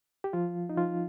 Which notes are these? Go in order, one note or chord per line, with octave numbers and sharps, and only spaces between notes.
G4
F3 F4
D#4
F3 F4